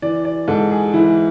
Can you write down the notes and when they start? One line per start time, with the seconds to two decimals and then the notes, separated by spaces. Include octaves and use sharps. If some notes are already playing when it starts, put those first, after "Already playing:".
0.02 E3 D5
0.25 D5
0.48 G#2 A4
0.71 G#4
0.94 E3 E4